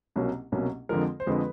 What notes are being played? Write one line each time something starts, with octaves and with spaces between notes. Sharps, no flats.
C2 B2 F#3 A#3 C#4
C2 B2 F#3 A#3 C#4
F2 D3 F3 G#3 A#4
C5
F2 D3 F3 G#3 B4